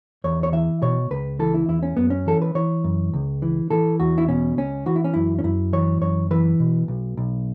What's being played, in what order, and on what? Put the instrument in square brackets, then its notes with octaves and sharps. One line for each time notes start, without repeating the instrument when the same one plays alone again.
[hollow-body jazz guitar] E2 C#5
C#5
E3 E5
B2 C#5
C#2 B4
E3 A4
E4
E2 E4
C#4
F#2 B3
C#4
E3 A4
B4
E3 C#5
F#2
C#2
E3
E3 A4
E2 F#4
E4
B2 C#4
C#2 C#4
E3 F#4
E4
C#4
F#2 E4
C#4
F#2 E4
E3 C#5
F#2 C#5
E3 B4
B2
B1
B1